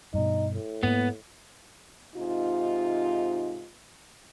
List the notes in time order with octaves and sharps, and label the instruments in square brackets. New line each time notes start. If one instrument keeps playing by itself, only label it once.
[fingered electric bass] G2 B2 [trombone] D#4
[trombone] A2
[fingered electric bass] G#2 A#3 [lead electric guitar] B3
[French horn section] G#2 C3 D#4 F4